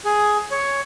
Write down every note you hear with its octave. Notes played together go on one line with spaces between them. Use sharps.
G#4
C#5